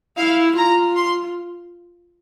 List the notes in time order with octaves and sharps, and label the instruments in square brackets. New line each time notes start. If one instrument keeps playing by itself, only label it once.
[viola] E4 [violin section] F5
[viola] F4 [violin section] A#5
[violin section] C6